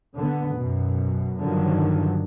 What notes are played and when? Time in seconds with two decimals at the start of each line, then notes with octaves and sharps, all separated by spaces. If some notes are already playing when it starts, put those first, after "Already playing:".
0.16 D3 B3
0.55 F#2 B2
1.40 G2 D3 D#3 F3 F#3